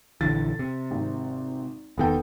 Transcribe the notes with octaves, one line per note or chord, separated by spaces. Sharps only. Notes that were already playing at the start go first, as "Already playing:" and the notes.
A#1 D3 E3 A6
C3
G#1
E1 D#3 B3 A4 G5